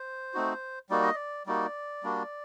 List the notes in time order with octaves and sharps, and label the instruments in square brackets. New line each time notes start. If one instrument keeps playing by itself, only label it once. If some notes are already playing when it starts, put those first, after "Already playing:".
Already playing: [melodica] C5
A3 C4 D#4 F#4
G3 A#3 D#4 F#4 D5
D#5
D5
G3 A#3 D#4 F#4 D5
G3 A#3 D4 F#4